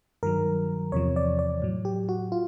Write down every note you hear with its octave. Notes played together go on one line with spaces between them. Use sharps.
G2 D#3 F#3 A#4
E2 C3 F3 C#5
D5
D5
A2 F#3
G4
F#4
F4